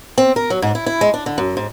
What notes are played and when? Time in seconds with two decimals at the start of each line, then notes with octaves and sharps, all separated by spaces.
0.18 C4
0.36 A#4
0.50 F#3
0.62 G#2
0.75 E4
0.86 E4
1.01 G#3
1.14 D4
1.26 D3
1.38 F#2
1.57 G#2